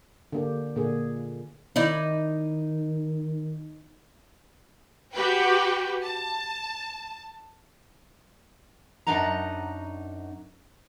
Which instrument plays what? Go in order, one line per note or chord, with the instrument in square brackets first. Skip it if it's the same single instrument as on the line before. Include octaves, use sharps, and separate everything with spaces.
[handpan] D3 A#3 G4
A#2 D3 A#3 G#4
[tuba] D#3 [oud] D#4 E4 D5
[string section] F#4 G4 B4 G5
A5
[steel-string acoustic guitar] F#2 G#3 D4 D#4 F#5 A#5